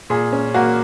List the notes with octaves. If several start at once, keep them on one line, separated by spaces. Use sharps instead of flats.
A#2 G#4
C#4
A#3 F#4